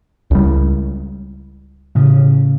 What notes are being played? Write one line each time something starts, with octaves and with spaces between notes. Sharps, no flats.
C#2 G3
A2 C#3